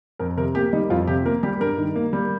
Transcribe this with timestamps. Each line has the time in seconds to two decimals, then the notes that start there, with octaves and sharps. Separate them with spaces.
0.19 F2 A#4
0.37 C3 A#4
0.55 A#3 G4
0.73 G3 D#4
0.90 F2 F4
1.07 C3 G4
1.26 A#3 A#4
1.43 G3 G4
1.60 G2 A#4
1.78 D#3
1.96 A#3
2.13 G3